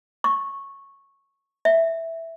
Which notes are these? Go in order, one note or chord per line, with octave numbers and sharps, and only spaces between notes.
C#6
E5